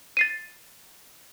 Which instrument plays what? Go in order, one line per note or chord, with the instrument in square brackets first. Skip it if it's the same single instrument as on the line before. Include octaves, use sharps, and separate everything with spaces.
[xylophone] A6 C7 D#7